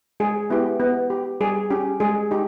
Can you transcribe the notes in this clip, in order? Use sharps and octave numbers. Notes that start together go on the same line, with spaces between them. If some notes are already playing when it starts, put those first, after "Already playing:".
G#3 G#4
B3 E4 G4
B3
G4
G3 G#4
C#4 G4
G#3 G#4
D#4 G4